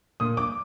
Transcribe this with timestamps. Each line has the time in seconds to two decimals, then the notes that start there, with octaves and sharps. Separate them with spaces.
0.20 A#2 D#6
0.37 D6